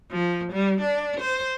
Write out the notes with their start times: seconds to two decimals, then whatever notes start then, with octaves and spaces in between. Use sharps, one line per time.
0.12 F3
0.52 G3
0.81 D4
1.20 C5